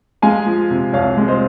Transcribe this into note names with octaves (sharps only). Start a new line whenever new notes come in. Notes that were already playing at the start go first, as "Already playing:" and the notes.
G#3 F5 G#5
F3
C3
C2 C#5 F5
G#3
C5 D#5